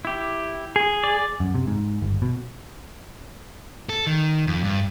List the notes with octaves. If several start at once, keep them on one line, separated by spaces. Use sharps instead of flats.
E4 G4
G#4
D5
F#2
C3
G#2
G1
B2
A4
D#3
F2
G2